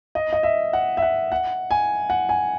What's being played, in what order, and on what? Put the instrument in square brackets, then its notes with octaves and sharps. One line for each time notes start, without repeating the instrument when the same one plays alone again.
[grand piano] D#5
D#5
E5
F#5
E5
F#5
F#5
G#5
F#5
G#5